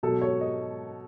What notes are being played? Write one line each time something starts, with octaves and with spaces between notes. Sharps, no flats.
B2 F#3 A4
C#5
D#5